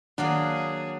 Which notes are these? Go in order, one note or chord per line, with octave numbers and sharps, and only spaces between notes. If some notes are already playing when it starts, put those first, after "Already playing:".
D#3 F#3 A#3 D4 G#4 D5 F5 F#5